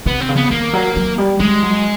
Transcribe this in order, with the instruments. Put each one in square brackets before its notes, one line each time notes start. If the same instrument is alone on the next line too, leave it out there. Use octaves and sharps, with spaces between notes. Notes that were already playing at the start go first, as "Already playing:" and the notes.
[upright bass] C3 [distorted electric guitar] B3
[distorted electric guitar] C4
[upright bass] C#3
[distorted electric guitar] B3
[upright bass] D#3 [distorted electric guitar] A#3
[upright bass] F#3
F#3
G3
[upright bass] G3 [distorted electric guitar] G#3
[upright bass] F#3